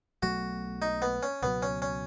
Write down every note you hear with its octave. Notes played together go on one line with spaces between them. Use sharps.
B1 B2 F#3 A3 F#4
D#4
B3
C#4
C#2 B2 F#3 B3
C#4
C#4